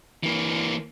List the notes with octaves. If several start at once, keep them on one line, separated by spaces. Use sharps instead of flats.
E3 A#3